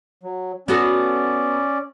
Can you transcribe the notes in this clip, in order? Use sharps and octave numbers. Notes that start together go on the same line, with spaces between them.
F#3
B3 C#4 F#4 A4 D5